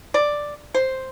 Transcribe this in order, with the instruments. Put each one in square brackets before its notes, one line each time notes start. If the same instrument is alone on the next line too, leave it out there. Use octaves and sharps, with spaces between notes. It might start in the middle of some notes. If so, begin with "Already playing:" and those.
[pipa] D5
C5